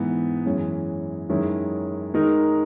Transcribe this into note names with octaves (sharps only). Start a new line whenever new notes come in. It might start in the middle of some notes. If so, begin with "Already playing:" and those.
Already playing: G#2 E3 B3
F#2 E3 G#3 C#4
F#2 D#3 G#3 C#4 E4
D#3 G#3 D#4 A#4